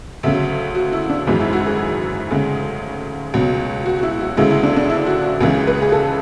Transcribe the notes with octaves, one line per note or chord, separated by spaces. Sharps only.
D2 C#3 F#3 E5
F#4
E4
D4
G#1 F#2 E3 G#3
E4
F#4
G#4
G#4
D2 C#3 G#3
C#2 B2 F#3
F#4
F#4
E4
F#4
D2 C#3 G#3 E4
E4
D4
D4
E4
F#4
F#4
C#2 C#3 E3 G#3 G#4
B4
G#4
A4